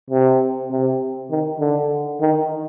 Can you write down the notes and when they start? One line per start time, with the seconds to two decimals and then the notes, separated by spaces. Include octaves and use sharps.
0.10 C3
0.71 C3
1.31 D#3
1.60 D3
2.21 D#3